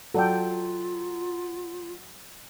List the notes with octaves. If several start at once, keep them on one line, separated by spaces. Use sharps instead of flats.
F#3 F4 A4 D5 G5